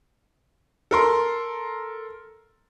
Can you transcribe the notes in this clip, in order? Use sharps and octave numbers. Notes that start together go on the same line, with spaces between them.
A4 A#4 C6